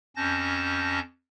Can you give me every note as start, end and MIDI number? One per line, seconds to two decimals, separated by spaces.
0.16 1.00 41
0.16 1.00 61
0.16 1.00 81
0.16 1.00 91
0.16 1.00 94